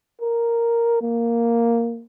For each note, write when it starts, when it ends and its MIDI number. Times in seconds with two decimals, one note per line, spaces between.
0.21 1.00 70
1.02 2.04 58